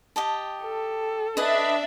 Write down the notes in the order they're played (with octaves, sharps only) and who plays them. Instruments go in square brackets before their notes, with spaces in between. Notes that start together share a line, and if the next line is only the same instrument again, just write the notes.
[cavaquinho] G4 D#5 A5
[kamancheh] A4
[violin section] D4 E5 [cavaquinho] B4 D#5